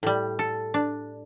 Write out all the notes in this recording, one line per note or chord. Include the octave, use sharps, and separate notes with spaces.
A2 G3
A4
D4